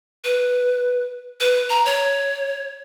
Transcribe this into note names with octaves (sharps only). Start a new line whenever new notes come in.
B4
B4
A#5
C#5